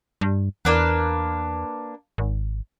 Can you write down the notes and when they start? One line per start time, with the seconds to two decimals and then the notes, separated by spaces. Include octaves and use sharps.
0.21 G2
0.65 E2 A#3 D4 B4
2.18 G#1